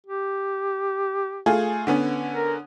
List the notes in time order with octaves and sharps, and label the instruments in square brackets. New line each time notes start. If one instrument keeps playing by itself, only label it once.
[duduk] G4
[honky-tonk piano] A3 F4 G#4
D3 B3 C#4
[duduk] A#4